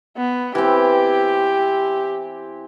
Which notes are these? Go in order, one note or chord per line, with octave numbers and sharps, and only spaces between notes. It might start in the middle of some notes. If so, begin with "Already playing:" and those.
B3
E3 C4 G4